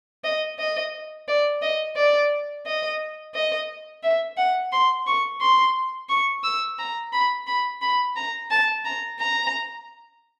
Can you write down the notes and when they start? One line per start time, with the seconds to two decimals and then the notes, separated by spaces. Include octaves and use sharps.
0.24 D#5
0.59 D#5
1.28 D5
1.62 D#5
1.96 D5
2.66 D#5
3.34 D#5
4.03 E5
4.37 F#5
4.72 C6
5.07 C#6
5.41 C6
6.09 C#6
6.44 E6
6.79 A#5
7.13 B5
7.47 B5
7.82 B5
8.16 A#5
8.51 A5
8.85 A#5
9.20 A#5